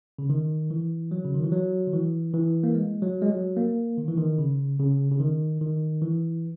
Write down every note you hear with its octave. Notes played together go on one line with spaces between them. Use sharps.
C#3
D#3
E3
F#3
C#3
D#3
E3
F#3
D#3
E3
E3
A#3
G#3
F#3
G#3
F#3
A#3
D#3
E3
D#3
C#3
C#3
C#3
D#3
D#3
E3